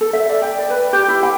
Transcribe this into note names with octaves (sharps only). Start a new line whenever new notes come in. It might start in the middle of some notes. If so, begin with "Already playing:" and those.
A4
E5
D5
G5
D5
B4
G4
E4
G5